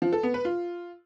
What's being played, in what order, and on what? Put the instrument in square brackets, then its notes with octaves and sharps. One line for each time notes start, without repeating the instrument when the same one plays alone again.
[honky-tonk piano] F3
A4
B3
B4
F4